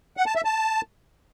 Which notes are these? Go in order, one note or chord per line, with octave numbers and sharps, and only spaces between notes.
F#5
A5
E5
A5